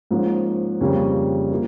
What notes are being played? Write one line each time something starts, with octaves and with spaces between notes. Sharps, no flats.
G#2 F3 A#3 C#4
F2 C#3 G3 A#3 C#4
F3 A#3 E4